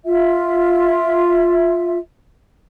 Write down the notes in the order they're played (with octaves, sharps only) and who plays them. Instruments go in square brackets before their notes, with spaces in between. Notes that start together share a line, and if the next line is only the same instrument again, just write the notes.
[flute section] F4 E5